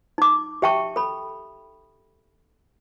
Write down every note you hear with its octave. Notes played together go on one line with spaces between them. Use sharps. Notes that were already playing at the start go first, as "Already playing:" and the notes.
D#4 D6
G4 E5 G5 A5 C#6
A4 B5